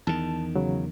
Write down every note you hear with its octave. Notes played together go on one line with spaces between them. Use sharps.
E2 D#3 A5
C#3 F#3